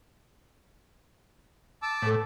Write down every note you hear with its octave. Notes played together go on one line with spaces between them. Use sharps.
A5 D6 E6
A2 A4 B4